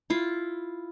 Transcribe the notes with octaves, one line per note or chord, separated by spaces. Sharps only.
E4 F4